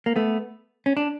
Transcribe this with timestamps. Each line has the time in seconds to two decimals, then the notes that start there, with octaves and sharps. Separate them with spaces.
0.06 A#3
0.16 A3 B3
0.86 C#4
0.97 D4